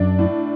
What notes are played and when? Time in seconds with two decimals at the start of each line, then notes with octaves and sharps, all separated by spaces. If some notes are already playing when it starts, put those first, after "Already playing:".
Already playing: F#2 D4
0.19 A2